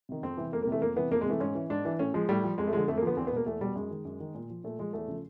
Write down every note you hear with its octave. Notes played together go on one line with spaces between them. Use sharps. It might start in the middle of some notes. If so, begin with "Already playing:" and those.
C3 D#3
F2 C4
C3 E3
F2 A#3
A#3
C3 E3 A3
F2 A#3
C3 E3 B3
F2 A#3
G#3
C3 E3 A3
G#2 C#4
E3
G#2 D4
E3
A2 C#4
F3 G#3
A2 G3
F3
F2 G#3
A3
D3 F3 G#3
F2 A3
A#3
D3 F3 B3
E2 C4
B3
B2 A#3
E2 A3
B2 G3
F#2 G#3
D#3
F#2
D#3
A#2
F3
A#2 A3
F3 G#3
E2 A3
C#3 F3